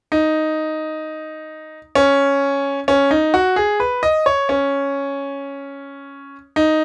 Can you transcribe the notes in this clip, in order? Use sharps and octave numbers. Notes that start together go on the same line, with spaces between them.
D#4
C#4
C#4
D#4
F#4
G#4
B4
D#5
C#5
C#4
D#4